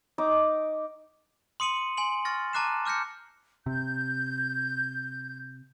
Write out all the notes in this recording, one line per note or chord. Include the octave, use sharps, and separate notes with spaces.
D#4 D6
C6 D#6 C#7 D#7 F#7
G#5 C6 F#7
C#6 F6 A6 A#6
A5 A#5 D6 F#6 C7 E7
D6 F6 G6 A#6 C#7
C3 G6